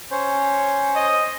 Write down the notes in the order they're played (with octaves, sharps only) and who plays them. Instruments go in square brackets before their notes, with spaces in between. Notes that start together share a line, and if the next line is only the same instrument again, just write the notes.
[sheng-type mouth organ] C#4 C5 C#5
[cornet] D#5